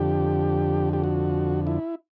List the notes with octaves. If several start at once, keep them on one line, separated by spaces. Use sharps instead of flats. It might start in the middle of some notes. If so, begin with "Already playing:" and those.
Already playing: F2 D3 G4
G4
F#4
E4